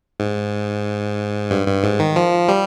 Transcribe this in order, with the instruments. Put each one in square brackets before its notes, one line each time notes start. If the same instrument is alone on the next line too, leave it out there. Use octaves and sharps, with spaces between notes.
[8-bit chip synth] G#2
G2
G2
G#2
D#3
F3
G3